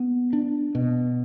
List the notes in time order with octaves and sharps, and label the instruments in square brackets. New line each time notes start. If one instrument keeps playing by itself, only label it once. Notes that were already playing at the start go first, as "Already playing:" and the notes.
Already playing: [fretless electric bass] B3
D4
B2